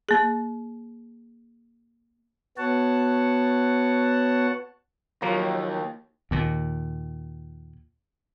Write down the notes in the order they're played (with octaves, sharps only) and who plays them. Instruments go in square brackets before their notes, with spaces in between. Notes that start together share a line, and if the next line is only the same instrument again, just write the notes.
[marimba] A#3 G#4
[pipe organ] B3 F#4 C#5 F#5 A5
[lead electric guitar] D#2 [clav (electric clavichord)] F3 F#3 A#3
[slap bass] D#2 A#2